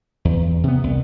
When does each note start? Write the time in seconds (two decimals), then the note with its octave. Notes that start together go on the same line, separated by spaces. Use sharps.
0.25 E2
0.64 C3 B3
0.84 C2